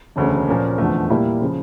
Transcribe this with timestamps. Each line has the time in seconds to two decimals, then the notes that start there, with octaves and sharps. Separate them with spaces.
0.16 E1 D2 C#3
0.47 A#2 F3 A#3 C#4
0.78 F1 E2 D3 F3 A3
1.09 A#2 G3 A#3 E4
1.41 C#3 F3